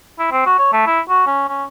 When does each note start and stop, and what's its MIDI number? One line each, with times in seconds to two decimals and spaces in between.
0.19 0.30 64
0.31 0.41 60
0.46 0.54 66
0.58 0.68 73
0.72 0.85 57
0.86 1.00 64
1.09 1.24 66
1.26 1.43 61
1.48 1.64 61